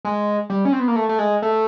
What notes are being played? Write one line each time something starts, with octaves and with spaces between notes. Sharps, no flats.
G#3
G3
C#4
C4
B3
A#3
A3
A3
G#3
A3